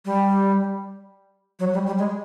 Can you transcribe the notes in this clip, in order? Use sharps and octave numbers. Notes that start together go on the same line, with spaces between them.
G3
F#3
G3
G3
G#3